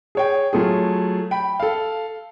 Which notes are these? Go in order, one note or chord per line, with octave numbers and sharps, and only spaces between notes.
G#4 C#5 G5
F#3 A3 F4 G#4
G5 B5
A4 F5